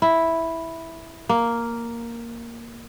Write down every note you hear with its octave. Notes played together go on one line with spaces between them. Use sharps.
E4
A#3